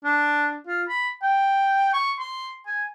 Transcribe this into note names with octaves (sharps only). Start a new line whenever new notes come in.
D4
F4
B5
G5
C#6
C6
G#5